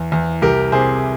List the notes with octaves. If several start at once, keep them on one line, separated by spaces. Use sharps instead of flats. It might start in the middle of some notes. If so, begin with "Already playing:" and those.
Already playing: E2
E2
C2 G4 A#4
C3 G#4 C5